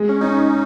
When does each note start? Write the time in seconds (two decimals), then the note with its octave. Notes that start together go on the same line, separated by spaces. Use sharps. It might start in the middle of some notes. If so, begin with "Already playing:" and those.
Already playing: G#3
0.09 C#4
0.21 C#4 D#4